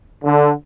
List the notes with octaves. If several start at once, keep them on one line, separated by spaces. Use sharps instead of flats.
D3